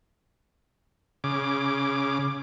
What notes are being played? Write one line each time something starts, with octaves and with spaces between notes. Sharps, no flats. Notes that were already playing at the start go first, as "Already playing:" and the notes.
C#3 D6